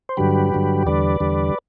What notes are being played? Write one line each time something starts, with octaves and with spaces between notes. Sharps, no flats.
C5
G2 D3 F#3 G4 B4
G2 D3 F#3
E2 D3 G3 B4 D5
E2 D3 G3